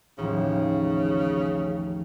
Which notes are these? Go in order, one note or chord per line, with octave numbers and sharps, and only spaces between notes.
A1 D#2 C#3 F3